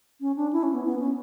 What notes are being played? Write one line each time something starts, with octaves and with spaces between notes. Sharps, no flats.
C#4
D4
E4
C#4
B3
B3
C#4